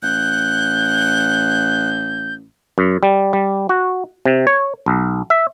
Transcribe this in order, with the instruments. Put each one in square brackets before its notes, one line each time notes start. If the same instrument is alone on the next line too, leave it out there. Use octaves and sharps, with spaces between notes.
[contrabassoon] A1 [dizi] F#6 [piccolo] G6
[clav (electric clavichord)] F#2
G3
G3
F#4
C3
C#5
B1
E5